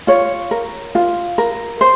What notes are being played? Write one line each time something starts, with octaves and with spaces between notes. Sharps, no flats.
F4 C#5
A#4
F4
A#4
C5